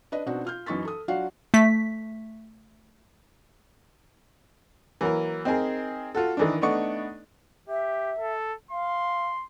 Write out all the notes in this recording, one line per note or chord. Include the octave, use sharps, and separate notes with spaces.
D4 B4 D#5
B2 C4 D4 D#4 F#4
F4 F6 G6
F#2 E3 D#4 C#6 A6 B6
A4 D#6
F#3 D4 F4 F#4 F5 F#5
A3 B6
E3 F#3 A#3 A#4
C4 D#4 G#4 A#4
F4 F#4 A4
D#3 E3 D4
A3 B3 D4 D#4 C#6
G4 E5
A4
F5 C6